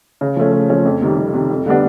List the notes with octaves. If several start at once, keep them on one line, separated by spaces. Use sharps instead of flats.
C#3
F3 A3 C#4
C#3
F3 A3 C#4
F2
C3 D#3 G3
F2
C3 D#3 G3
F2
D3 G3 B3 D4